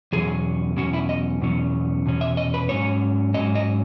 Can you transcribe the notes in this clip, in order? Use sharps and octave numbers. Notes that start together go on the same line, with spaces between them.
E2 B2 F#3 C#4 G#4
E2 B2 F#3 C#4 F#4
E4
D#5
E2 B2 F#3 C#4
E2 B2 C#4
E5
D#5
B4
G#2 F#3 C#4 C#5
G#2 F#3 C#4 D#5
D#5